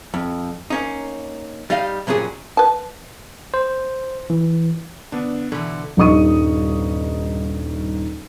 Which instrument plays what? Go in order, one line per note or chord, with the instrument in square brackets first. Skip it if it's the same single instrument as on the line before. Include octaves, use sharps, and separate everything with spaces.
[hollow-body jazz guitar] F2
A#3 C#4 D#4
G3 D#4 D#5 F5
G2 A#2 F#3 C#4 G#4
[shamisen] B4 A5
[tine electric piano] C5
E3
[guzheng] D3 [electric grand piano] B3 D4
[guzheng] B2 E3 [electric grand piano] D3
[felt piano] D#1 G2 D#4 C#6 D#6 D#7